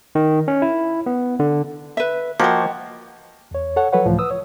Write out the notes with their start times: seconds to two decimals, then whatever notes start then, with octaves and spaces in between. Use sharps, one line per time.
0.15 D#3
0.48 C#4
0.62 E4
1.06 B3
1.40 D3
1.97 B4 E5
2.40 F3 A#3 F#4 C5 D#5 F#5 G5
3.51 E2 C#5
3.76 A4 C#5 F#5
3.93 F3 F#3 A4 B4 C#5 F#5
4.06 C#2 A2 E3 F3 A3
4.19 B4 D#6 E6
4.31 C#5